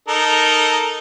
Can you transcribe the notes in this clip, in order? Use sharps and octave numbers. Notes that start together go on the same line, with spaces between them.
D#4 A4 A#4